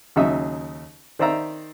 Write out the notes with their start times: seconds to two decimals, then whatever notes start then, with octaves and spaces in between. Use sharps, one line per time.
0.16 D#2 C#3 F#3 D#4 E5 D#6
1.19 D#3 C5 D5 E5 A#5 E6